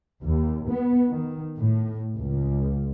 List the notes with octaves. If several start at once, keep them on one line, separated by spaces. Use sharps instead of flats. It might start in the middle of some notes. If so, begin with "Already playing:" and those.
D#2
B3
D#3
A2
C#2